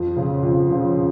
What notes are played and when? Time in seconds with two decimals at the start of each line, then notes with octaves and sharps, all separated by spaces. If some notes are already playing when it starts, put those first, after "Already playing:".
Already playing: F2
0.16 C#3 F3
0.43 F2
0.71 C#3 F3